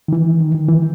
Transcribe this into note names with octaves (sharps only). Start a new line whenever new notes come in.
D#3
E3
D#3
D#3
E3